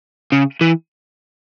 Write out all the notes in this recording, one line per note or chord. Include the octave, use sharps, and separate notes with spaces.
C#3
E3